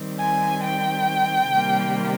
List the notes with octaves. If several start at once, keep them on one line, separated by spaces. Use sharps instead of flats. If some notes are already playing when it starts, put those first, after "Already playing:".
Already playing: D#3 G3 C4
G#5
G5
C3 D#3 G3 A#3